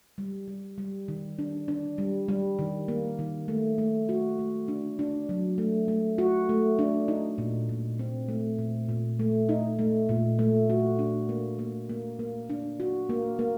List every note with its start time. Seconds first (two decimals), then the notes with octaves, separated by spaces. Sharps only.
0.18 G3
0.48 G3
0.78 G3
1.08 D#3
1.39 D4
1.68 D4
1.98 G3
2.28 G3
2.59 D#3
2.88 A#3
3.19 D#3
3.48 A3
3.78 A3
4.09 F#4
4.39 A3
4.68 D4
4.99 D4
5.29 F#3
5.58 A3
5.88 A3
6.18 F#4
6.49 A3
6.79 D4
7.08 D#4
7.38 A#2
7.69 A#2
7.99 C4
8.28 A3
8.58 A#2
8.89 A#2
9.19 A3
9.49 D#4
9.79 A3
10.09 A#2
10.39 A3
10.70 F#4
10.99 D4
11.29 A#3
11.59 A#3
11.89 A#3
12.19 A#3
12.50 D4
12.80 F#4
13.09 A#3
13.39 A#3